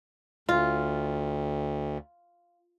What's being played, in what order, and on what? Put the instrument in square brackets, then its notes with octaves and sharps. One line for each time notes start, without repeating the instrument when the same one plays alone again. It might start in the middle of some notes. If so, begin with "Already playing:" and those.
[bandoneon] D2 [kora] F4